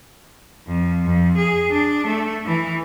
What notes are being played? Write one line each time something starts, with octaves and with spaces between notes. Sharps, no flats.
F2
F2
G#4
D4
A3
E3